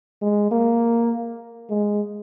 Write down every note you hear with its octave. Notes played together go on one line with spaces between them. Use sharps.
G#3
A#3
G#3